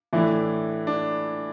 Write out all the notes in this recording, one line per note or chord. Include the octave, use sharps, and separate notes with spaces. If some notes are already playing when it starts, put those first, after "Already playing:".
A2 E3 A3 D4 E4
D4